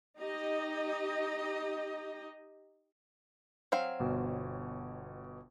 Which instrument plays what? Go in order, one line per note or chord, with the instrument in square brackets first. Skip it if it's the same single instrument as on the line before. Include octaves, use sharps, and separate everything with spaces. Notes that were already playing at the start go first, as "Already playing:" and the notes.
[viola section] D#4 G4 D#5
[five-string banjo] F#3 C4 F5
[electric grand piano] G1 B2